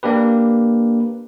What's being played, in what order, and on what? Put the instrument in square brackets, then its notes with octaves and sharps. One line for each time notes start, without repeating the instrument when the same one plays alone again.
[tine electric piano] A#3 D4 G4 B4